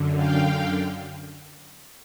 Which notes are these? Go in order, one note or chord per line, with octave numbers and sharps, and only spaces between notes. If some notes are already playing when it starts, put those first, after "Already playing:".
Already playing: F#2 D3
F5 G5